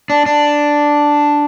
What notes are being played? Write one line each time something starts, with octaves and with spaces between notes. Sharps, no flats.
D4
D4